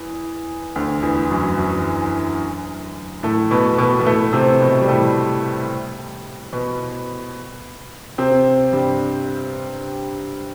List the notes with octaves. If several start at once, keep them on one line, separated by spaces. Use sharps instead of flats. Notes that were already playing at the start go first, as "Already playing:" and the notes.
Already playing: E2 E3
D2 D3
E2 E3
F#2 F#3
F#2 F#3
A2 A3
B2 B3
B2 B3
B3
A2 A3
C3 C4
B2 B3
G3
A2 A3
B2 B3
C3 C4
G2 G3